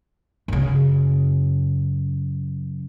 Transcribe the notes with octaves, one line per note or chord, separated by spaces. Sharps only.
F#2 C#3